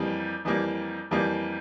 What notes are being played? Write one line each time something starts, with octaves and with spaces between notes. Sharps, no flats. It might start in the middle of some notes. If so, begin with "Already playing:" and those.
Already playing: F2 E3 G3 A#3
F2 E3 G3 A#3
F2 E3 G3 A#3